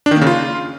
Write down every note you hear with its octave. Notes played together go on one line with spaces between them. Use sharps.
D4
D#3
A#3
C#3
F4